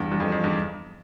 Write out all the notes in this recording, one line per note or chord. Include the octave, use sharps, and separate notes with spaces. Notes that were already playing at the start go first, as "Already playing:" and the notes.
Already playing: E2 G2
E2 G2
F2
F2
E2 G2